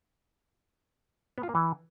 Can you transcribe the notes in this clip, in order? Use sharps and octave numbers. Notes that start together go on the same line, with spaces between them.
B3
F4
A#3
E3